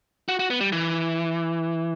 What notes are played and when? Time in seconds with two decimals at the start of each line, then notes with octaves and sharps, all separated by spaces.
0.29 F#4
0.39 F#4
0.50 B3
0.61 G3
0.72 E3